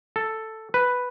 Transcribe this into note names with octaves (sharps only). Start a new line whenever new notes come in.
A4
B4